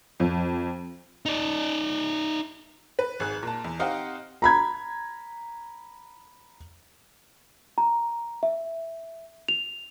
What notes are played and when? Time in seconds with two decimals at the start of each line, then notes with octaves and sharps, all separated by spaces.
0.20 F2
1.26 D#4 D5
2.99 B4
3.20 G#1 G#4 F#6
3.43 A#2 A5
3.64 E2
3.80 C4 D#4 G4 D#5 F5 F#5
4.42 A#5 B5 G#6
7.78 A#5
8.43 E5
9.48 F7